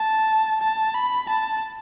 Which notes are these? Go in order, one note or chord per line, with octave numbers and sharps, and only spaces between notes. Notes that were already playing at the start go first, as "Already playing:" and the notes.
Already playing: A5
A5
B5
A5